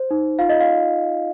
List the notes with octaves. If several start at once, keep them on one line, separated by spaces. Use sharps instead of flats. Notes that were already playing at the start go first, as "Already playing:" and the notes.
Already playing: C5
D#4
F4 F5
D#5
F5